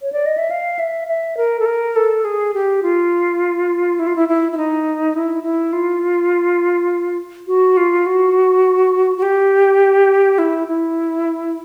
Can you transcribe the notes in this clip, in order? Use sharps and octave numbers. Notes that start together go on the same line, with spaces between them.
C#5
D5
D#5
E5
F5
E5
E5
A#4
A4
A#4
A4
G#4
G4
F4
E4
F4
E4
E4
E4
D#4
E4
E4
F4
F#4
F4
F#4
F#4
G4
E4
E4